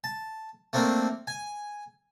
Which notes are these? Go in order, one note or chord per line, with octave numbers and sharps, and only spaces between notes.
A5
A3 A#3 C4 D4 A#4
G#5